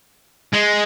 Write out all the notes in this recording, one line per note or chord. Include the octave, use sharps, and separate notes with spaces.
G#3